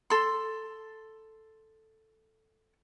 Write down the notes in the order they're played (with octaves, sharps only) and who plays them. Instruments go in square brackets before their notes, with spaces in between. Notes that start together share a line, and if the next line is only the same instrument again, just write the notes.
[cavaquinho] A4 C6